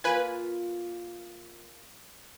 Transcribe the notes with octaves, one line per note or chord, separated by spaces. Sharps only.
A#3 F4 B4 G#5